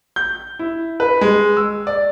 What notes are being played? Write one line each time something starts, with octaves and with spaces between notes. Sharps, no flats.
G6
E4
B4
G#3
E6
D5